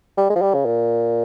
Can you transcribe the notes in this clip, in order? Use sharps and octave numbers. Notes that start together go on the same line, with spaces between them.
G3
G#3
F3
G3
C#3
A#2